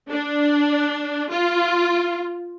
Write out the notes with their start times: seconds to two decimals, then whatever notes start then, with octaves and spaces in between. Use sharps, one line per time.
0.10 D4
1.32 F4